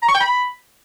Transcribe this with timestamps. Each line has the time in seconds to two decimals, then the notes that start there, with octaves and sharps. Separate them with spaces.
0.02 A#5
0.08 C#6
0.14 G5
0.20 B5